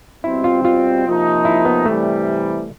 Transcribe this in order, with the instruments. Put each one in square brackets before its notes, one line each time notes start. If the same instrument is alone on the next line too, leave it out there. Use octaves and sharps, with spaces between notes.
[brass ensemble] B2 G3 C4 [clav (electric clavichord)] E4
[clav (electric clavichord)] F4
F4
[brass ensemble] C3 F3 A#3 D#4
[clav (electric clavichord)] E4
B3
[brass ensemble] C3 E3 G3 [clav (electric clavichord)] A3